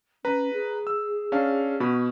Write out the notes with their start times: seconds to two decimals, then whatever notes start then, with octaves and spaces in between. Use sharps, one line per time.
0.25 C#4 B4 A#5
0.53 G#4
0.87 E6
1.32 C#4 D4 F5
1.80 B2 F#4 B5